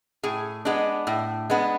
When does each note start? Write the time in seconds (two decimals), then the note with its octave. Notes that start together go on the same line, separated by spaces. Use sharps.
0.23 A2 G#4
0.65 G#3 B3 D4
1.07 A2
1.50 G#3 B3 D4